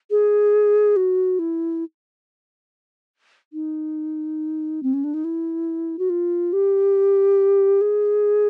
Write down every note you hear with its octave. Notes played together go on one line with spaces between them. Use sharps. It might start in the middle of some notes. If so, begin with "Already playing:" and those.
G#4
F#4
E4
D#4
C4
C#4
D4
D#4
E4
F#4
F4
G4
G#4